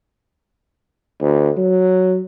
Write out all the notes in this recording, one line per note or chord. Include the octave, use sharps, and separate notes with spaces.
D2
F#3